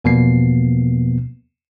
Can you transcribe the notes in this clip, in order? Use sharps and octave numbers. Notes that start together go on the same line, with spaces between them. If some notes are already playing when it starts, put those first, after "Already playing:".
E2 B2 F3 A#3 B3 C7